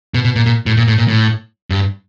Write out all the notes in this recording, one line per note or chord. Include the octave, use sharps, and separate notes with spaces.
B2
B2
A#2
A#2
A2
A#2
A2
A#2
A2
G2